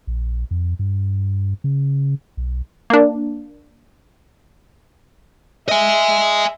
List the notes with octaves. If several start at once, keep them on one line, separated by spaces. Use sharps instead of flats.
A#1
F2
G2
C#3
B1
A#3 D4
D#5 E5 G#5